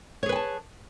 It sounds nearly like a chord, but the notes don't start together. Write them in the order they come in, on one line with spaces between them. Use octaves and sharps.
C#5 G#4 B4 G#5 A5